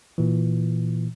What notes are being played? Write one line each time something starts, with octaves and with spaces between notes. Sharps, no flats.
A#2 E3